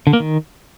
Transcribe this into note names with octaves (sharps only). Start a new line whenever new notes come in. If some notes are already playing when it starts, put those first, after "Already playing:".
D3
A#3
D#3